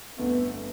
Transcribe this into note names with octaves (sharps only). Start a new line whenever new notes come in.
G1 F2 D3 A3 B3